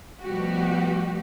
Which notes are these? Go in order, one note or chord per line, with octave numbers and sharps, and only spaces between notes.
B2 F3 G3 A3 F#4 G4